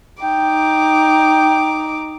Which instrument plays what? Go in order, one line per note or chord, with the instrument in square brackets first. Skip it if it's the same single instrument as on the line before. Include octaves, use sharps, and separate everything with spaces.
[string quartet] D#4 D6 [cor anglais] G5